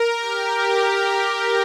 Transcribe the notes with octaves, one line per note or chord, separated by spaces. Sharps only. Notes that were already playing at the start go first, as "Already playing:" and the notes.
Already playing: A#4
G4